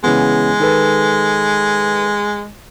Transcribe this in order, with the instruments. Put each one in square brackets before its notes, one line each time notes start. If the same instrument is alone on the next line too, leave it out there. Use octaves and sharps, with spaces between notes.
[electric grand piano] C#3 E3 B3 [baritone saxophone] G#3
[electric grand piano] D#3 A4 B4